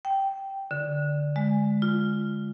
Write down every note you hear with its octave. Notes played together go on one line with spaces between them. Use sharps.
G5
D3
G#3
F4